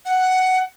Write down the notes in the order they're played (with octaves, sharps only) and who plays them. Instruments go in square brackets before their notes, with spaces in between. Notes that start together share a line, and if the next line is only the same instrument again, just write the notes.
[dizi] F#5